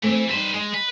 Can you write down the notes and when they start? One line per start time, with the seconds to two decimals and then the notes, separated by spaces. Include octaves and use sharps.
0.03 E3 A3 C4 C5
0.30 G3 D#4 B4 C5
0.54 G#3 D#5
0.74 B4